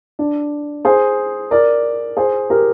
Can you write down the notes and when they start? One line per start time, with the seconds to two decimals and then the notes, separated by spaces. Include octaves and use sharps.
0.19 D4
0.85 G#4 C5
1.51 A#4 D5
2.17 G#4 C5
2.50 G4 A#4